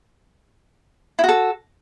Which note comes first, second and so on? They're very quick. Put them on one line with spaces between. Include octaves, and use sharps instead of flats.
E4 F#4 A4